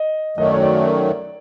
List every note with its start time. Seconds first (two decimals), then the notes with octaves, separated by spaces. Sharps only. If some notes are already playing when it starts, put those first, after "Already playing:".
Already playing: D#5
0.37 F#2 D#3 F#3 A3 D#5
0.46 D5
0.54 C#5
0.62 D5